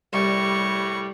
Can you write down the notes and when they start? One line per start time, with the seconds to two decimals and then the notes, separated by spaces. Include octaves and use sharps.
0.13 C2 A2 G3 C#6